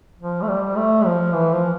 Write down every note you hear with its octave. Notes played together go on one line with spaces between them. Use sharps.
F3
A3
G3
A3
F3
E3
F3